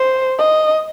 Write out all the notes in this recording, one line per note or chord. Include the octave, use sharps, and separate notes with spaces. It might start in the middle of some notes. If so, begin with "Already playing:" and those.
Already playing: C5
D#5